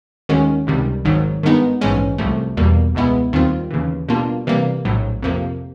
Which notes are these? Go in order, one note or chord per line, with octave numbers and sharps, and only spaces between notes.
D#2 D#3 G#3 C#4 F#4
C#2 C3 D#3 G3
G#1 G#2 D#3 F#3
G2 D#3 G#3 B3 D#4
A#1 G#2 E3 G#3 C#4
C2 C3 F3 A3
E2 B2 G3 A#3
C#2 B2 G#3 B3 E4
D#2 D#3 G3 C4 F4
D#2 C#3 E3
B2 G3 A#3 D4 F4
C3 E3 G3 A#3
A#1 A2 F#3
F2 C3 F3 A#3